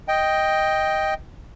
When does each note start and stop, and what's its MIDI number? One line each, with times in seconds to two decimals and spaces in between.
0.08 1.14 75
0.08 1.14 79